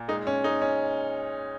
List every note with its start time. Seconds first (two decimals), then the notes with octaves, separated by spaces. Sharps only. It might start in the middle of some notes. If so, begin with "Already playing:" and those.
Already playing: A#2
0.08 G#3 D#4
0.27 C#4
0.44 G#3 D#4
0.62 C#4